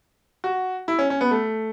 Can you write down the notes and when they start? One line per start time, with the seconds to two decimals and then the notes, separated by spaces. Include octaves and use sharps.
0.44 F#4
0.88 E4
0.99 C#4
1.10 C#4
1.21 B3
1.31 A3